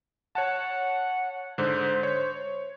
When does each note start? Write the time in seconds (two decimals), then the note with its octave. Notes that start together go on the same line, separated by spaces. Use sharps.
0.35 C#5 F#5 A5
1.58 G#2 D3 C5
2.03 C#5